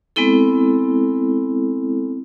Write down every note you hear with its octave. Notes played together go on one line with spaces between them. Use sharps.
G#3 B3 C4 E4 A4